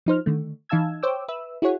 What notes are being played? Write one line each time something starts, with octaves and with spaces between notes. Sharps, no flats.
F3 D#4 C5 F6
D3 D#3 A3
E3 D#4 F5 A5 E6 G#6
C5 C#5 G5 D6 E6
B4 E5 E6
E4 F#4 G#4 C#5 F#5